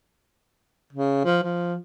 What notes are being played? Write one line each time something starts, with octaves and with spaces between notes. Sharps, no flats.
C#3
F3
F3